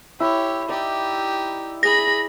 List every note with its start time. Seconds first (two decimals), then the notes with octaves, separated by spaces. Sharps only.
0.20 E4 G4 C#5
0.69 D#4 G4 D5
1.83 G#4 B5 A#6